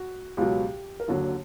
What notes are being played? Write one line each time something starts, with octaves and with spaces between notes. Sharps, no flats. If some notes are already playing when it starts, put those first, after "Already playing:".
Already playing: F#4
C#2 B2 F#3 G4
A#4
D#2 D3 F#3 A4